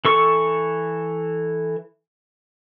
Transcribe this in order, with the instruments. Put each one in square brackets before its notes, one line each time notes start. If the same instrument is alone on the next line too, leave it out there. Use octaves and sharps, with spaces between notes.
[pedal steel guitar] E3 A4 C#6